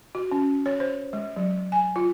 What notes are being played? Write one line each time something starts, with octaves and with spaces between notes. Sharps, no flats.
F#4
C#4
C#5
C5
G#3
F#3
G#5
F4